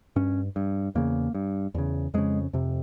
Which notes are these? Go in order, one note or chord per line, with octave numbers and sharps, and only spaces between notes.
G2 C#4
G2
E2 C#3 A#3
G2
E2 C#3
F2 C#3 G#3
F2 C3